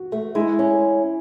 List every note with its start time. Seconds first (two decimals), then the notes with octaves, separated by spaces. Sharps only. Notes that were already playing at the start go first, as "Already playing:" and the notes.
Already playing: F#4
0.12 A3
0.35 G#3 E4
0.59 C#4